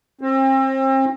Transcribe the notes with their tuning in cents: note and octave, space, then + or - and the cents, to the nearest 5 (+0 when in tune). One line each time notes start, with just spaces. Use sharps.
C4 +35